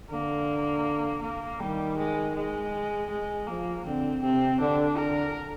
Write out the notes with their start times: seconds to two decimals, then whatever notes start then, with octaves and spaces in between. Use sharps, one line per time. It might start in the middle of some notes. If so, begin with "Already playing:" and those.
0.10 D3 A#3
1.23 A#3
1.60 D#3 G3
1.98 G#3
2.35 G#3
3.10 G#3
3.47 F3 A#3
3.85 D3 C4
4.23 C3 C4
4.60 D3 D4
4.98 D3 A#4